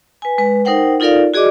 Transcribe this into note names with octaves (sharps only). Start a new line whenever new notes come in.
B4 G#5
G#3 B4
D#4 A#4 C5 F#5 G5
D#4 F4 A4 A#4 D5 F5
F#4 G#4 D5 D#5 D6